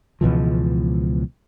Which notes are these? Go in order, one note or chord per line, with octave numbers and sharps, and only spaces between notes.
C#2 B2 E3 F3